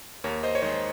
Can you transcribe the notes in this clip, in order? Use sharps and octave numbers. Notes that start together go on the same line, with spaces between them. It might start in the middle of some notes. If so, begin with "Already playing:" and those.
D#2 A#4 C#5
C5 D#5
C#5
D#3 G#3 C5 D#5